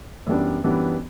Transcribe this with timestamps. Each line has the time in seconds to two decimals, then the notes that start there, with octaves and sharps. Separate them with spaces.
0.26 F#2 E3 G3 B3 D4
0.64 F#2 E3 G3 B3 D4